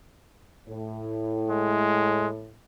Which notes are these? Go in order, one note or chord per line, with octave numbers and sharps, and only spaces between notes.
A2
G#3